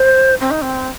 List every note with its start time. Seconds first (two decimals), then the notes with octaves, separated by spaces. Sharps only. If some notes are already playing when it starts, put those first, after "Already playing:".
Already playing: C5
0.40 C4
0.51 D#4
0.62 C4